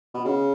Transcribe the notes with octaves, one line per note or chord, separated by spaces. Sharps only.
B2
C#3